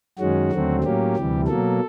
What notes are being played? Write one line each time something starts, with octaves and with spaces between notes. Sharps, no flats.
F#2 D#3 G#3 C#4 F#4
D#2 D3 F#3 A3 C4
A2 F#3 A#3 C#4 G4
D2 C3 E3 G3
B2 F#3 A#3 A4